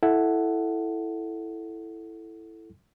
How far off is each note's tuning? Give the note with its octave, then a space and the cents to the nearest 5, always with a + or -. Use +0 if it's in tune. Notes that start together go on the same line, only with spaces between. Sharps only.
E4 +0 A4 +0 F#5 +0